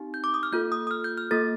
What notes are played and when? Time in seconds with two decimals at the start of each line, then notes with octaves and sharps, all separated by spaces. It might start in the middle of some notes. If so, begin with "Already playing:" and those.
Already playing: C4 D#4 G4
0.14 G6
0.24 D6
0.34 D#6
0.43 F6
0.52 A#3 F4 A4 G6
0.72 D#6
0.87 D#6
0.91 F6
1.04 G6
1.18 F6
1.31 A#3 F4 A4 A6